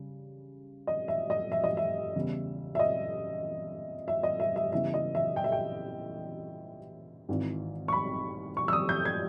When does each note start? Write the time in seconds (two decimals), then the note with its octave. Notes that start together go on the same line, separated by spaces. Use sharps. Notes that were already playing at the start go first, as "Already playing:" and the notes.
Already playing: C#3 G3
0.87 D#5
1.08 E5
1.30 D#5
1.52 E5
1.64 D#5
1.77 E5
2.15 E2 C#3 G3
2.75 E5
2.79 D#5
4.08 E5
4.23 D#5
4.40 E5
4.56 E5
4.72 E2 C#3 E3 G3 E5
4.94 D#5
5.15 E5
5.36 G5
5.44 E5
5.52 G5
7.29 G#1 G#2 E3
7.88 C#6
7.93 B5
8.57 C#6
8.68 E6
8.73 D#6
8.89 G6
9.05 G#6